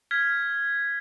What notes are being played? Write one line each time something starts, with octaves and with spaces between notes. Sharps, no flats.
F6 G#6 B6